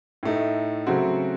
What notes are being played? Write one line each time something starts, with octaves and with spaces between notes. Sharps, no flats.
A2 A3 D#4
C#3 F#3 A3 C4 F#4